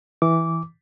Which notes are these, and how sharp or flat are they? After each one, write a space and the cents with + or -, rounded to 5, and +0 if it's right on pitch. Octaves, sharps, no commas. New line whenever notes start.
E3 -10 D6 -15